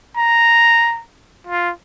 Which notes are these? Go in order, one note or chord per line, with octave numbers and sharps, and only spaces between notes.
A#5
F4